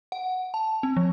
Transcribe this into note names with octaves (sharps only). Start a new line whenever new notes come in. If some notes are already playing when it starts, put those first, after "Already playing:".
F#5
A5
C4
F3